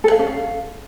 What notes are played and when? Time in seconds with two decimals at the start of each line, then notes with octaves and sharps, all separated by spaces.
0.04 A4
0.12 F5
0.19 C#4
0.27 F5